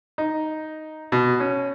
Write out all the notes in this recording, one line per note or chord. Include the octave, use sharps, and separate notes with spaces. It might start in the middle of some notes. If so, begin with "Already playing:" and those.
D#4
B2
C#4